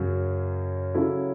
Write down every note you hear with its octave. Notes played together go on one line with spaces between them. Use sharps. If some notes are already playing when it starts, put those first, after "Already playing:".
Already playing: F#2 C#3 F#3 C#4
C#3 F#3 C#4 E4 A4